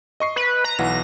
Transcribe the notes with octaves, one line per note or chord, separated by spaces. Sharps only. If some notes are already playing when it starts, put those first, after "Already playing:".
D#5 C#6 C7
B4
A#5
B1 E3 F#5 A#6